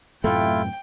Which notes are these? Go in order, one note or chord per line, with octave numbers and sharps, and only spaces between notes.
F#2 A2 C3 A3 E4 F4 G5